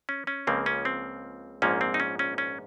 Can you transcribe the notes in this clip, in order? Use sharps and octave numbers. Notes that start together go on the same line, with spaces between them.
C#4
C#4
C#2 C#3 F3 A#3 C4
C#4
C4
A#1 G#2 F3 A#3 C#4
C4
D#4
C#4
C#4
C#4